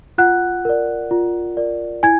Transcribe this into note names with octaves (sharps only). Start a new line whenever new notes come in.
F4 F#5 F#6
A#4 D5
F4
A#4 D5
E4 G#5 G#6